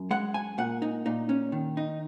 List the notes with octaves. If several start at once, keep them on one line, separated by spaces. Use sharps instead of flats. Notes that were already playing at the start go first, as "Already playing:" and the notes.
Already playing: F#2
G#3 F#5
G#5
A#2 F#5
D#4
A#2 D#4
C#4
D#3
D#4